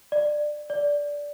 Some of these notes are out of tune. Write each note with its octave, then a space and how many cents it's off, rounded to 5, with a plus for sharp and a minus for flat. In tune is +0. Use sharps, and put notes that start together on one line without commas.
D5 +20
D5 -10